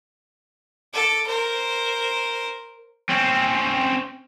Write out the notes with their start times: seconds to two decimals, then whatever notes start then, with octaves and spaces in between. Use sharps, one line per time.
0.93 A4 D6
1.26 A#4 C5
3.10 C4 C#4